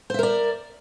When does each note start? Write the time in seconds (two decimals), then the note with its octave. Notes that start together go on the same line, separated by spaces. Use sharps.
0.10 C5
0.14 E5
0.19 A#4
0.23 D5